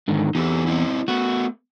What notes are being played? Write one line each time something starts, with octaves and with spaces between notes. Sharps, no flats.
G#2 D3 D#3
E2 D#4 G4 A4
C4 D#4 E4
A3 B3 F#4